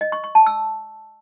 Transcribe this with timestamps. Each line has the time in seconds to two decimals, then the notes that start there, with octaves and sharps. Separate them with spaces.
0.01 D#5
0.12 C#6
0.24 C#6
0.35 A5
0.46 E6